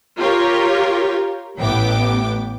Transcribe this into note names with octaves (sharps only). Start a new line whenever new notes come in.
F4 G4 A#4 C#5
A1 A2 B3 G5 D6